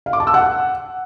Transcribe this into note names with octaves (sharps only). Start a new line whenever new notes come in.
F5
D6
A5
E6
F#5